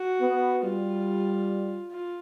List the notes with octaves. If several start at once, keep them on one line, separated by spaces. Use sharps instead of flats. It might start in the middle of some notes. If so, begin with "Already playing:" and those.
Already playing: F#4
B3
G3 F4
F4